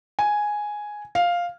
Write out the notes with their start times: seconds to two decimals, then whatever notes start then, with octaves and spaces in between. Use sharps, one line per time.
0.19 G#5
1.15 F5